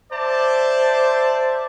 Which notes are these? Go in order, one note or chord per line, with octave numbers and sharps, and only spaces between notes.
C5 D5 E5 A5